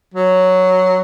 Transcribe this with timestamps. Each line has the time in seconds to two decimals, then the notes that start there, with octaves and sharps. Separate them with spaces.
0.14 F#3